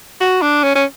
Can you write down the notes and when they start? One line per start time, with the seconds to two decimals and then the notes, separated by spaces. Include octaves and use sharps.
0.21 F#4
0.42 D4
0.63 C#4
0.75 C#4